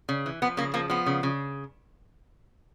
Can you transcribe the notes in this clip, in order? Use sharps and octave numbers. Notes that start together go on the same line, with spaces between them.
C#3
E3
F3 B3
C#3 A#3
F3 A#3
F3 B3
C#3
C#3